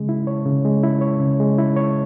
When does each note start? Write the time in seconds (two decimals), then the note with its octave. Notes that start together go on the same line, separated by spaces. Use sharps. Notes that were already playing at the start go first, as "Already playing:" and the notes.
Already playing: C#3 G#3
0.09 E4
0.27 C#5
0.45 C#3
0.65 G#3
0.83 E4
1.01 C#5
1.20 C#3
1.40 G#3
1.58 E4
1.76 C#5